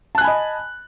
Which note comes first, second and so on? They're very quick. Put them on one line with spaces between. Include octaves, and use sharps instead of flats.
A5 F#6 G#5 B5 D#5